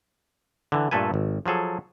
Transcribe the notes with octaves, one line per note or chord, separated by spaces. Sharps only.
D3 E3
G2 A#2 A3 A4 B4 G#5
G#1
F3 F#3 G#4 A4